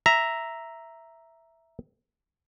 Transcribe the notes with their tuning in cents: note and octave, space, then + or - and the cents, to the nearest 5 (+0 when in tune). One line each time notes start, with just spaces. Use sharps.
E5 +0 A#5 +0